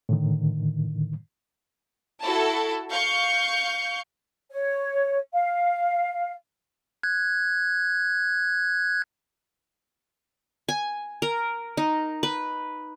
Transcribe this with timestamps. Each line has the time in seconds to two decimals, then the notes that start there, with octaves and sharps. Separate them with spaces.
0.09 A2 D3 D#3
2.24 E4 F#4 A4 A5
2.90 F5 C#6 G6
4.51 C#5
5.33 F5
7.03 F#6 G#6
10.69 G#5
11.22 A#4
11.77 D#4
12.23 B4